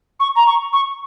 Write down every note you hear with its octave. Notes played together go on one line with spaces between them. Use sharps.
C#6
A#5
C#6
C#6